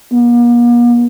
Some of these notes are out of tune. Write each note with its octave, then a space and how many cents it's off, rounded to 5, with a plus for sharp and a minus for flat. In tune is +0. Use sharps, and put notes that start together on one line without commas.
A#3 +45